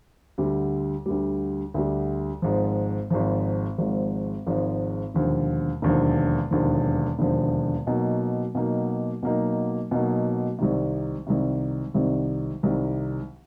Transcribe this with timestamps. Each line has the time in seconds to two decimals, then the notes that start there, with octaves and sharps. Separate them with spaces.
0.38 D2 D3 G3
1.06 D2 D3 G3
1.74 D2 D3 G3
2.42 G#1 G#2 F3
3.10 G#1 G#2 F3
3.78 G#1 G#2 F3
4.47 G#1 G#2 F3
5.14 E1 D#2 D3 F3
5.82 E1 D#2 D3 F3
6.51 E1 D#2 D3 F3
7.19 E1 D#2 D3 F3
7.87 B2 F#3 A#3 D#4
8.55 B2 F#3 A#3 D#4
9.23 B2 F#3 A#3 D#4
9.91 B2 F#3 A#3 D#4
10.59 C2 C3 D#3
11.27 C2 C3 D#3
11.94 C2 C3 D#3
12.63 C2 C3 D#3